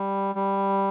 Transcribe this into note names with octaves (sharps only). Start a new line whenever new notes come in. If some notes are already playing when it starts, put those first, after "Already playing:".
Already playing: G3
G3